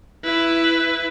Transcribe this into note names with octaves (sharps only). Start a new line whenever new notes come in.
E4 B4